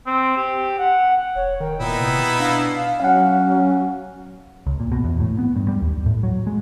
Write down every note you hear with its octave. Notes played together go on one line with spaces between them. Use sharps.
C4
G4
F#5
E1 C#5
D#3 G5
A#2 B3 D#4 E4
C3
B2 B5
D4 F5
F#3 C#4 F5 F#5
C#2
A#2
B2
E2
A2
B3
G2
G3
D#2
A2
F#3
G#3